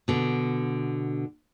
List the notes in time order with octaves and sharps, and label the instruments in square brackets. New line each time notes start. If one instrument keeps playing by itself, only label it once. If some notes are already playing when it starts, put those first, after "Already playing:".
[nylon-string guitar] B2 D3